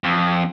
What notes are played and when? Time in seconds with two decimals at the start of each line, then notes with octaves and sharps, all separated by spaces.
0.04 F2